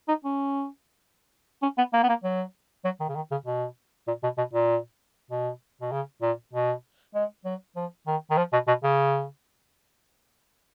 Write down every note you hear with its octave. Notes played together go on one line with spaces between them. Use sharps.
D#4
C#4
C#4
B3
A#3
B3
A#3
F#3
F#3
D#3
C#3
D#3
C#3
B2
A#2
B2
B2
A#2
B2
B2
C#3
A#2
B2
G#3
F#3
F3
D#3
D#3
F3
B2
B2
C#3